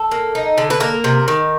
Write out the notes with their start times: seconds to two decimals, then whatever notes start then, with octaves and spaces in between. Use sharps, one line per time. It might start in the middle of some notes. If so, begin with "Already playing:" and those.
Already playing: A4
0.11 A#3
0.35 D#4
0.58 D3
0.70 B4
0.80 A#3 A#4
1.04 C3
1.28 D#3